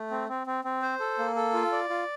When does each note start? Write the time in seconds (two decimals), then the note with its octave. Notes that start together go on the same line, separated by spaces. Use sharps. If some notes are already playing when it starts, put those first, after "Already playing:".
Already playing: A3
0.11 C4
0.29 C4
0.47 C4
0.65 C4
0.82 C5
1.00 A4
1.19 A#3
1.36 A4
1.54 F4
1.72 D5
1.89 F4